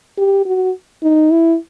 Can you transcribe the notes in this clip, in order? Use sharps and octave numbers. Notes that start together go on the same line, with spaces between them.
G4
F#4
D#4
E4